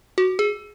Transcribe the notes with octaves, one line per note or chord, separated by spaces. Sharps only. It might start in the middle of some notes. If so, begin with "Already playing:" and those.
F#4
G#4